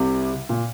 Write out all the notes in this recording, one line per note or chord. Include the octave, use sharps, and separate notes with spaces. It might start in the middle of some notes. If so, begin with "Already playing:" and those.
Already playing: C2 C3
A#2